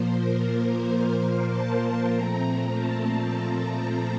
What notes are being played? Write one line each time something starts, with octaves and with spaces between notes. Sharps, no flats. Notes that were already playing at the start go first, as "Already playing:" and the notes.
Already playing: A#2 F3 A#3 C5
A#4
C5
A5
A#2 F3 A3 C4 A#5
A5
A#5
A#5